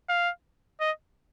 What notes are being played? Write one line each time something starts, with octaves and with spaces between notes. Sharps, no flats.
F5
D#5